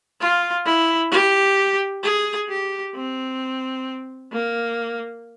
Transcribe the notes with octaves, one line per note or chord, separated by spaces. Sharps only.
F4
E4
G4
G#4
G4
C4
A#3